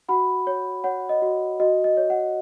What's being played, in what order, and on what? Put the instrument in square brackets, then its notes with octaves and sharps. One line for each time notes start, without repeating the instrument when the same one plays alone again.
[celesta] F#4 F#5 B5
C#5
C#5 F#5
D#5
F#4
F#4 D#5
D#5
C#5
F#5